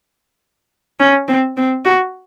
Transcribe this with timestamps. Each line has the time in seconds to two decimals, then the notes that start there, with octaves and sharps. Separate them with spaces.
1.00 C#4
1.28 C4
1.57 C4
1.85 F#4